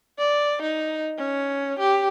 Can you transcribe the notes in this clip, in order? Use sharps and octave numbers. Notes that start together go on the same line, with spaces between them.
D5
D#4
C#4
G4